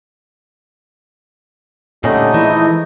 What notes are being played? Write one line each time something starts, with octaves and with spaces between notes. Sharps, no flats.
A#2 D3 G3 A3 C#4 D#4 D#5
E3 F3 G#3 E4